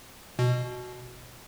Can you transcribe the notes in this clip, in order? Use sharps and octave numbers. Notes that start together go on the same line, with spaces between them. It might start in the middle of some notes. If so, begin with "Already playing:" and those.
B2